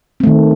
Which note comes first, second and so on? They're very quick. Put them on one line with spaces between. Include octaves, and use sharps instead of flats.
C4 A3 D#3